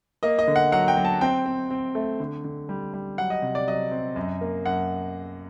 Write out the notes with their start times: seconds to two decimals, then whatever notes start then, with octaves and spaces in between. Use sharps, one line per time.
0.23 A#3 D#5
0.39 D#5
0.47 D3
0.56 F#5
0.72 F#3 F#5
0.88 G5
0.97 F#3
1.05 A5
1.21 C4 G5
1.46 C4
1.70 C4
1.95 A3
2.20 D3
2.44 D3
2.69 G3
2.93 G3
3.18 F#3 F#5
3.30 D#5
3.42 C3
3.55 D5
3.68 F#3 D#5
3.91 C4
4.16 F#2
4.41 A#3
4.65 F#2 F#5